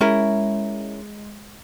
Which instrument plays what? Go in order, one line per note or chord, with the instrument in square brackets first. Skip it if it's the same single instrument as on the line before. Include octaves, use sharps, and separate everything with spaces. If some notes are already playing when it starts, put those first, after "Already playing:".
[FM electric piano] G#3 [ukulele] C#4 E4 A#4